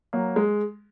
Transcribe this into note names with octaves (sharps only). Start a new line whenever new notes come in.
F#3 A#3
G#3